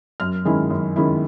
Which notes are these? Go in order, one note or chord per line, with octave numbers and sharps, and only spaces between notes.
F#2 F6
D#3 G#3 C#4 E4
F#2
D#3 G#3 C#4 E4